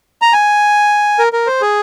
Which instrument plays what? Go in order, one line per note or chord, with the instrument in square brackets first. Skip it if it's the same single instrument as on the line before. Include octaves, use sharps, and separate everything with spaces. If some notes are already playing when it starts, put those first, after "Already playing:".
[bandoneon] A#5
G#5
A#4
A#4
C5
G#4